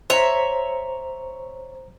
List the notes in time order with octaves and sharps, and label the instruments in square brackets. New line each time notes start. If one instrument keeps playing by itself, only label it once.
[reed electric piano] C5 A#5 [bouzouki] C#5 E5